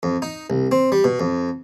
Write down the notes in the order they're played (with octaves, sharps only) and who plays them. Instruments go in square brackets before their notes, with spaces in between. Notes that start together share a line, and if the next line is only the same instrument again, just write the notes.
[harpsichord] F2
D#4
C2
C4
G3
B2
F2